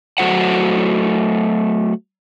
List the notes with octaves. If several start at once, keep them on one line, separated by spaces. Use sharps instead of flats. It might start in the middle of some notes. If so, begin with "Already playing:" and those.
F#3 A3 F#4 C5 F#5